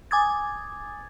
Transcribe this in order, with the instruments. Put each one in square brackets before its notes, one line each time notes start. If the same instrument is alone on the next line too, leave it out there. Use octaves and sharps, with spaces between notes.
[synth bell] G#5 D6 D#6 G#6 A6